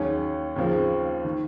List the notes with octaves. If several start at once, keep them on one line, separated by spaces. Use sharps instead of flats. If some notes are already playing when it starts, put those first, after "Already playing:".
Already playing: D#2 D#3 F#3 C#4 G#4
D#2 C#3 F3 C4
D#3